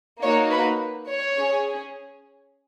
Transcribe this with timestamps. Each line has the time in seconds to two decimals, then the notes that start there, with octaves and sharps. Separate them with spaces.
0.22 A#3 D#4 F#4 C#5
0.51 B4
1.09 C#5
1.38 C#4 G#4